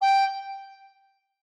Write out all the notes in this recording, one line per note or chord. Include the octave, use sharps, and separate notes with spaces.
G5